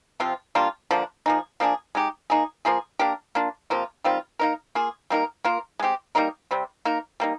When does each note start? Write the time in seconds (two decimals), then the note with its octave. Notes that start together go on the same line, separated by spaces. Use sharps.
0.20 C3 F3 C4 F4
0.55 G3 A#3 D4 F4
0.91 D3 F3 A#3 D4
1.26 F3 A#3 D#4 G#4
1.60 F3 A#3 D4 G#4
1.95 G#3 D#4 G4
2.30 A#3 D#4 G#4
2.65 F3 A#3 F4 G#4
2.99 A#3 D4 G4 A#4
3.35 A#3 D4 F4
3.70 C3 F3 A#3 F4
4.04 D#3 G3 C4 F4
4.39 A#3 D#4 A#4
4.75 A#3 F4 G#4
5.10 G3 A#3 D#4 A#4
5.44 A#3 F4 A#4
5.79 G#3 C4 G4
6.15 G3 A#3 D#4 A#4
6.51 C3 G3 C4
6.85 A#3 D#4 A#4
7.20 G3 A#3 D#4